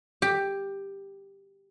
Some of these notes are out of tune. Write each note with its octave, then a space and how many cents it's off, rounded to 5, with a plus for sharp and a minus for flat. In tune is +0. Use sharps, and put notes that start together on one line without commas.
G4 +10